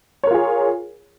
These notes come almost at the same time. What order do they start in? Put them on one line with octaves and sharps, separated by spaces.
C#5 A#4 F4 G#4